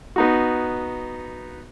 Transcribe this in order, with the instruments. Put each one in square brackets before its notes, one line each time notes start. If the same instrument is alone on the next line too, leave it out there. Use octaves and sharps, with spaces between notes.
[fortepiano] B3 D#4 F#4